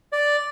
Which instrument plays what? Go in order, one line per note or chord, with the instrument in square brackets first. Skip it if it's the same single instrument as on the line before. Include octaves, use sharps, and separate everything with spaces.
[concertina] D5